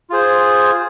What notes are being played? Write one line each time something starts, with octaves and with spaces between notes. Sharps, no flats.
F4 G#4 C5